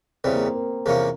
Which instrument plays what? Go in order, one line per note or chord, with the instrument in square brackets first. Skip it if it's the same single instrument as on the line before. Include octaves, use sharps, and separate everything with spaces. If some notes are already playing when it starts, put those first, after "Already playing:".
[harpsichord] E2 C#3 E3 G3 [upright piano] C4
[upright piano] A#3
C4
A#4
[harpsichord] E2 C3 F3 A#3 C#4 [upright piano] A#4